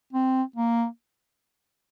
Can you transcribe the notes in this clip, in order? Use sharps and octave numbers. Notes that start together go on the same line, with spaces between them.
C4
A#3